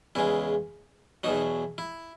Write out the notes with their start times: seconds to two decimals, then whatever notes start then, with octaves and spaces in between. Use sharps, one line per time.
0.15 E2 C#3 G#3 E4
1.24 E2 B2 F#3 D#4
1.78 E4